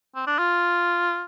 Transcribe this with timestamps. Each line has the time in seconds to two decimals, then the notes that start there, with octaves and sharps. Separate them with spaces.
0.15 C4
0.27 D4
0.38 F4